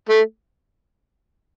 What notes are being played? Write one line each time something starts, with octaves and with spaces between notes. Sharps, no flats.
A3